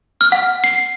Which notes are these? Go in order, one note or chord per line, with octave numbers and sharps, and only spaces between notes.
F6
F#5
C7